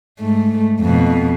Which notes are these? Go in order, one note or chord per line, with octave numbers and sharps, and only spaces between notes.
G#2 A3
F2 B2